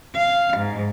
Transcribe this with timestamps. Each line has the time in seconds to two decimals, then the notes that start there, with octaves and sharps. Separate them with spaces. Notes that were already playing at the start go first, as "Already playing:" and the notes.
0.14 F5
0.57 G#2